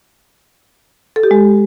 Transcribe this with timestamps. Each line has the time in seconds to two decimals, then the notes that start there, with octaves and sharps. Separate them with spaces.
1.16 A4
1.23 G4
1.31 G#3